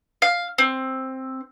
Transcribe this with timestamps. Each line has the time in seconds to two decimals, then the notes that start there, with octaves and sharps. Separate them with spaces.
0.22 F5
0.58 C4